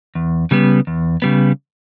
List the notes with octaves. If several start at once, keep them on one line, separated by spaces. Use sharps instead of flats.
E2
C#3 G3 B3
E2
C#3 G3 B3